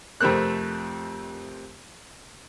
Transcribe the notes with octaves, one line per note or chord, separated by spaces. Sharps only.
F2 C3 A3 C4 A#4 F#6